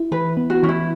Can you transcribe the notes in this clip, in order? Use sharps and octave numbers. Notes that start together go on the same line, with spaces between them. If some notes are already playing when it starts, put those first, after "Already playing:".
Already playing: E4
E3 B4
B3
F#4
E3 C#4
E4